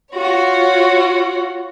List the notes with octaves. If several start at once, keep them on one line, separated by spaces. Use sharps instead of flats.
F4 F#4 C#5